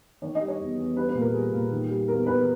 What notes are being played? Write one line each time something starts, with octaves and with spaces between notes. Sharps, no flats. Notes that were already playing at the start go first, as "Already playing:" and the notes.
D#3 C#5
G3 D#5
C#5
E2
E2
G3 B4
B4
A#2
A#4
G3 G#4
A#2
D#3
G3
E2 A#4
E2 B4